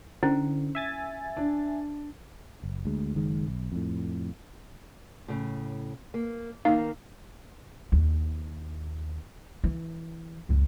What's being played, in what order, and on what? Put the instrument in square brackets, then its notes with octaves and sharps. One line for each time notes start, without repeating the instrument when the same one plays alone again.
[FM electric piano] D3 [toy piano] C#4 E4 C5
[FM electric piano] E5 G#5 A6
[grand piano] D4
[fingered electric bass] F#1
D2 G#3
F#1 D#3 G#3
B1
F2 A2
[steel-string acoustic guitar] A2 C#3
A#3
[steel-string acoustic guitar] D#3 A#3 [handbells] D#4 F5
[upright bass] D#2
E3
C#2 F#2